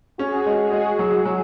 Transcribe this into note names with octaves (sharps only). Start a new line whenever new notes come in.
C#4 F#4 G#4
G#3
F#4 G#4
G#3
F#3
F#3